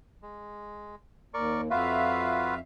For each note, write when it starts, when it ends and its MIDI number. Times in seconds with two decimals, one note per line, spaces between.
0.22 0.95 56
1.34 1.69 39
1.34 1.61 70
1.34 1.61 74
1.34 1.61 85
1.71 2.59 41
1.71 2.55 65
1.71 2.55 66
1.71 2.55 71
1.71 2.59 76
1.71 2.59 77